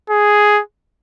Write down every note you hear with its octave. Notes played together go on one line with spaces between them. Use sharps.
G#4